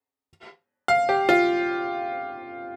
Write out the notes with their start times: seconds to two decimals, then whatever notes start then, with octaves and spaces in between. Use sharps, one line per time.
0.88 F5
1.09 G4
1.29 F4